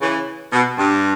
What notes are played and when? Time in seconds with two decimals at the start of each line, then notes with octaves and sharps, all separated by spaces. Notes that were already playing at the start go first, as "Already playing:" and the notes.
0.01 C#3 E3
0.53 B2
0.78 G2